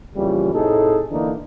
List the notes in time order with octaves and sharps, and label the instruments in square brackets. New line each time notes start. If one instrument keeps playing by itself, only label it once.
[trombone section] F2 A#2 C#3 E3 G3
A2 C3 D#4 G#4 A4
D3 E3 A3 A#3 D4 D#4